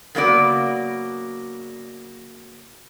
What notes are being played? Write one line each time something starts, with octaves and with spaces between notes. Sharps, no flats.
C#3 F#3 A#3 B3 F#4 D5